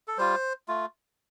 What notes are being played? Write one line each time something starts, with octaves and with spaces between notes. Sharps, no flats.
A4
G3 F4 C5
A3 F4